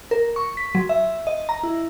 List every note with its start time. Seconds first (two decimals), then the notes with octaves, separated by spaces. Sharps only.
0.11 A#4
0.36 C#6
0.57 B6
0.75 F#3
0.89 E5
1.27 D#5
1.49 A#5
1.63 E4